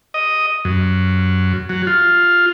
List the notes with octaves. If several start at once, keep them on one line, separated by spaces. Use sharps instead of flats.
D#5
F#2
F#3
F4